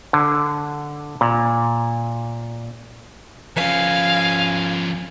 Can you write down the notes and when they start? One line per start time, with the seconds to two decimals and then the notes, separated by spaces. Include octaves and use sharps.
0.13 D3
1.21 A#2
3.57 F3 C#4 F5 G#5